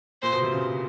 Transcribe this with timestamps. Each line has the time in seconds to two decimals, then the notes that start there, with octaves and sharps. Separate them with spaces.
0.22 A#2 C5
0.33 B2
0.42 C3
0.52 C#3